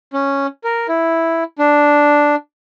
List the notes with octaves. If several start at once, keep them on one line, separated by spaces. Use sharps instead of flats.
C#4
A#4
E4
D4